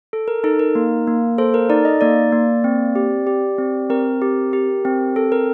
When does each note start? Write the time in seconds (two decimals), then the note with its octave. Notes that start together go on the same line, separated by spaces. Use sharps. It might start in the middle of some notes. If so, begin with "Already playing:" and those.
0.13 A4
0.28 A#4
0.44 D#4 A4
0.59 A#4
0.75 A#3
1.07 A#3
1.38 A4 C5
1.54 A#4
1.70 D#4 D5
1.85 D#5
2.01 A#3 D5
2.33 A#3
2.64 C4
2.95 G4
3.27 G4
3.58 C4
3.90 C4 A#4
4.22 G4
4.53 G4
4.85 C4
5.16 A4
5.32 A#4